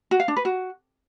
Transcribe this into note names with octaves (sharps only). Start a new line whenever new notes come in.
F#4
F5
D4
B4
F#4